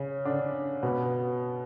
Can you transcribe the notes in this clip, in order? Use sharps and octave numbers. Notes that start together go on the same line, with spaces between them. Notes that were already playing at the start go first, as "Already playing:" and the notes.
Already playing: C#3 C#4
D3 D4
B2 B3